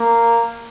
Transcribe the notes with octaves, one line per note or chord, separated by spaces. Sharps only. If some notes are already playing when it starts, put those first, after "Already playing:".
Already playing: A#3